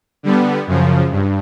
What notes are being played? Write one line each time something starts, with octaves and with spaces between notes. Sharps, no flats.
D3 G3 B3
F#2 C#3 F3
G2